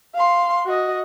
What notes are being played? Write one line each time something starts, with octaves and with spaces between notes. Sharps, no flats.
F5 C6
F#4 D#5